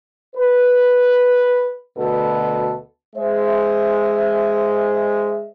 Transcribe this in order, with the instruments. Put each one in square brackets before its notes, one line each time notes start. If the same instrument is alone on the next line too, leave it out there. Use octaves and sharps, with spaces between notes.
[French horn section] B4
D2 B2 A4 B4
[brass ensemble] G#3 C5 E5